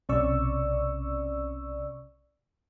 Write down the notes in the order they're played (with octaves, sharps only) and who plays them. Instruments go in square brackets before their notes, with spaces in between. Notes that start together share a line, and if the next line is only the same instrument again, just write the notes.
[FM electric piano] B1 C3 C#4 D5 C#6 E6